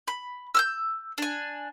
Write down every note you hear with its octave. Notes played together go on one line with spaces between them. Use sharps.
B5
E6 F6 G6
D4 G#5